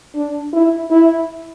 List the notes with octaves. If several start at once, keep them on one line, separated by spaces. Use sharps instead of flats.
D4
E4
E4